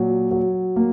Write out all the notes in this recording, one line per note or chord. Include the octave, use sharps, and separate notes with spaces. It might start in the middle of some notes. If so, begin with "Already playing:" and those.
Already playing: A#2 F#3
F#3
A#3